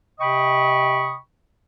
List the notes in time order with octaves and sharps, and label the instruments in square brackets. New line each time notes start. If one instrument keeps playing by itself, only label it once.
[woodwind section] C3 D#5 G5 B5 C#6 D#6